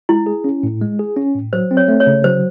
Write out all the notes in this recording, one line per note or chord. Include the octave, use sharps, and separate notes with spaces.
G#3 E4
G#4
C#4
A2
G#3
G#4
C#4
A2
F#3 C5
C4
C#5
A3
C#5
C#3
F#3 C5